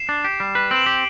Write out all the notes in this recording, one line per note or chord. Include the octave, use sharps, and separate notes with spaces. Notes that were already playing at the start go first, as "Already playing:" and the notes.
Already playing: C7 E7
D4
G4
G3
B4
C4 D7 E7 F#7
D7 F#7
G4
D7 F#7